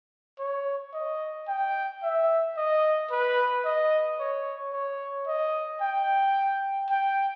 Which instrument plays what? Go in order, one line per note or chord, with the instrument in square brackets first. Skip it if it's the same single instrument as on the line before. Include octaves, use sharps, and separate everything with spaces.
[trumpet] C#5
D#5
G5
E5
D#5
B4
D#5
C#5
C#5
D#5
G5
G5